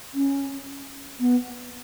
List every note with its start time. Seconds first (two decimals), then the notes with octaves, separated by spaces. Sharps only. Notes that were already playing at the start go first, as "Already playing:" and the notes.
0.14 C#4
1.20 B3